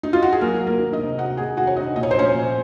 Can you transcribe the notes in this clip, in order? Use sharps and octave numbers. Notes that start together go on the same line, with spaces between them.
D#4
F4
F#4
G#4
F#3 A#3 A#4
F#3
A#3 A#4
D#3
D#4 D#5
C3
C3 F#4 F#5
A#3 G#4 G#5
D#3 F#4 F#5
C#5
C3 D#4 D#5
A#2 D#5
C#5
C5
F3 C#4 C#5
A#2